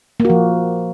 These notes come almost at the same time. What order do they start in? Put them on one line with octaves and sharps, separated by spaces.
A#3 F#4 F3